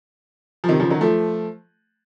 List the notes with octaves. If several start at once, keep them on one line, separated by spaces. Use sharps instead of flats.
F3
C3 D#3
C#3 F3
D#3 F#3
F3 A3